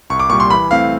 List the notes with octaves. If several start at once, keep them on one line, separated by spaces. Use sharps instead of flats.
C2 C#6
D6
A#2 G3 C#6
C6
E3 B5
A3 C4 E4 F5